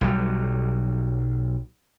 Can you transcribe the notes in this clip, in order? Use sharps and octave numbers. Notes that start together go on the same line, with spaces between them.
B1 F#3 G3